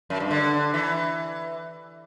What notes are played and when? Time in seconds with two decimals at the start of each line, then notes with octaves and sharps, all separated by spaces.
0.10 F#2
0.20 G2
0.31 D3
0.74 E3